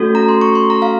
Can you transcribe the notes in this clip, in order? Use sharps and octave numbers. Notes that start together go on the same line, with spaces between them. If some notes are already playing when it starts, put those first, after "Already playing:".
Already playing: A3 C#4 F#4 A4
A#5
C6
C#6
C6
A#5
F5